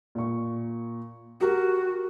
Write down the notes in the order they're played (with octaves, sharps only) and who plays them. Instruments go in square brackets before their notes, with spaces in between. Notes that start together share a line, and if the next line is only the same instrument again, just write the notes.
[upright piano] A#2 C#6
[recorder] F#4 [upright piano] G4 A#4